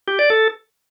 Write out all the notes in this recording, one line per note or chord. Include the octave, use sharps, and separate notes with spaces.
G4
D5
A4